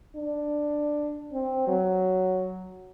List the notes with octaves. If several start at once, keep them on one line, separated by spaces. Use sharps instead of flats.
D4
C4
F#3